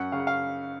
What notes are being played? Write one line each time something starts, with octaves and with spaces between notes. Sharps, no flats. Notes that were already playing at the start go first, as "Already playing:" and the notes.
Already playing: F#2 F#5
C#3 F5
F#5
F5